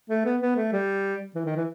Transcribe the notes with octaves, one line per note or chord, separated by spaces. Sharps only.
A3
B3
B3
A3
G3
E3
D#3
E3